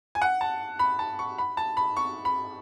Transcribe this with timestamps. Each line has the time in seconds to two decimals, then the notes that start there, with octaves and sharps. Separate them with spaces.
0.15 G#5
0.22 F#5
0.41 A5
0.79 B5
0.99 A5
1.19 C#6
1.38 B5
1.57 A5
1.77 B5
1.97 C#6
2.25 B5